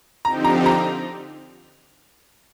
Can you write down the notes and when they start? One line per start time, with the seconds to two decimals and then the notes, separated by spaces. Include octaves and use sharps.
0.24 D3 F3 C4 D#4 G4 A#5
0.44 A#5
0.66 A#5